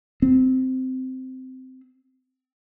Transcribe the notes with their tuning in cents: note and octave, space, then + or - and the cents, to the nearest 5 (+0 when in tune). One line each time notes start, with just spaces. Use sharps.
C4 -15